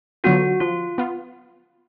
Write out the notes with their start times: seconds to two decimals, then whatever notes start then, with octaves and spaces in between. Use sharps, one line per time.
0.24 D3 F#3 B3 F4 F#4
0.60 F3 F4
0.98 B3 F4